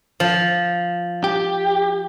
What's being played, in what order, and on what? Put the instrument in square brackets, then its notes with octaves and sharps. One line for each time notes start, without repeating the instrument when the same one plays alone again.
[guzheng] F3
[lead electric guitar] G4